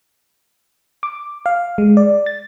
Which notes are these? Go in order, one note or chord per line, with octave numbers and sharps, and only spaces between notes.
D6
F5
G#3
D5
A6